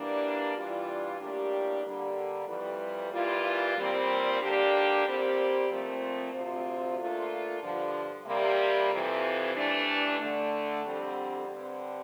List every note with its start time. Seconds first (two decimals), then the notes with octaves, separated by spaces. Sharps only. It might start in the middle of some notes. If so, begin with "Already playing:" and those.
Already playing: E3 G3 A#3 D4
0.54 E3 G3 D4 F4
1.19 A2 G3 A#3 D4 G4
1.83 D3 G3 A#3
2.47 F2 E3 G3
3.12 E3 G3 A#3 F4
3.76 A#2 G3 C4
4.40 D3 G3 A#3 D4 G4
5.05 A#2 G3 C4 G4
5.68 A#2 F3 A3 C4
6.33 D2 C3 F3 C4 F4
6.98 A#2 A3 D4 F4
7.62 G2 D3 F3
8.26 C3 G3 A#3
8.90 F2 C3 E3
9.54 G2 E3 A3 D4
10.19 D3 A3 D4
10.83 F2 D3 G3 C4
11.48 G2 D3 G3 C4